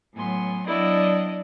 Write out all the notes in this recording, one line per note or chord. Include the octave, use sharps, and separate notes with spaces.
A2 F#3 B3 G#5 C6
F#3 B3 D4 E4 D5 D#5